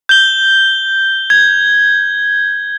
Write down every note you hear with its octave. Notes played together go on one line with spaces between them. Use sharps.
G6 G7
G#6